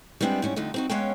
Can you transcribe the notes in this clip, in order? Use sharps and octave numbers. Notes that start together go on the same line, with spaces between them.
G3 G#3 B3 C4 D4 E4
G#2 G3 C#4
F2 D3 A3 D#4
C4 D#4 F#4
G#3 B3 C#4 C#5 F5 G5